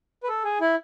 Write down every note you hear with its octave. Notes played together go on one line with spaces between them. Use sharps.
B4
A4
G#4
E4